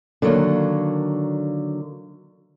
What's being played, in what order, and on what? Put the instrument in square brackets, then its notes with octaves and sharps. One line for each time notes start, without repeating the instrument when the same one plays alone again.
[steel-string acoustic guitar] D3 D#3 F#3 A#3